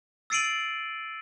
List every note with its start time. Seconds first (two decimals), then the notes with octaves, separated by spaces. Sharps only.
0.30 E6 A6 C7 D7 D#7 F#7